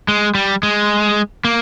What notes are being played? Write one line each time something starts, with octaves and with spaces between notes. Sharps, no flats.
G#3
G3
G#3
A#3